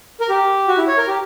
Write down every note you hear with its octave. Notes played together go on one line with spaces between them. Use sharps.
A#4
G4
F#4
E4
C#5
A#4
G4